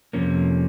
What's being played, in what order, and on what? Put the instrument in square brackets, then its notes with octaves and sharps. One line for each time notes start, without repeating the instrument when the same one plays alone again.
[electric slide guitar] F2 C3 F3 A#3 C#4